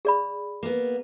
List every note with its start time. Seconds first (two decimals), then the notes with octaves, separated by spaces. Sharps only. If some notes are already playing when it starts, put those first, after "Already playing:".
0.05 G#4 D5 B5
0.63 A#3 B3